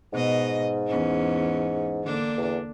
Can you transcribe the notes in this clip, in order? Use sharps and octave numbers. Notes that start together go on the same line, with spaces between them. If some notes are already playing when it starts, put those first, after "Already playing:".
G#2 B2 D#5
E2 C#4
D3 A#3 D4
E2